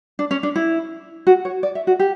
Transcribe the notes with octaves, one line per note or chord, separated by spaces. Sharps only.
D4
C#4
D4
E4
F#4
C#5
D5
E5
F#4
G4